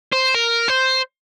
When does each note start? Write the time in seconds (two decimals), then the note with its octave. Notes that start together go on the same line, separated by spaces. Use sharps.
0.13 C5
0.35 A#4
0.68 C5